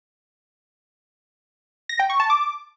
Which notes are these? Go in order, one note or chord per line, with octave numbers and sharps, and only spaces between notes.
A#6
G5
C#6
A5
D6